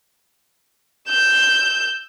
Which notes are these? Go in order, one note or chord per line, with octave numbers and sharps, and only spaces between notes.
E6 G6